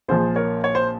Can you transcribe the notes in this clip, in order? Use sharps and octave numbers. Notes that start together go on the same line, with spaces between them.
A#1 A#2 F3 G#4 C5
A#4 C#5
C#5
C5